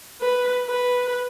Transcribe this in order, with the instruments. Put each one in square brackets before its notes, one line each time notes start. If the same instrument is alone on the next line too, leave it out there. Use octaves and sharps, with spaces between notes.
[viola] B4
B4